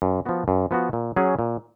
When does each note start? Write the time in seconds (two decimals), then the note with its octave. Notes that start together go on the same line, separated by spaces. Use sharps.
0.02 F#2
0.25 F3 B3 F#4
0.48 F#2
0.71 F3 B3 F#4
0.93 A#2
1.16 F#3 C#4 G#4
1.39 A#2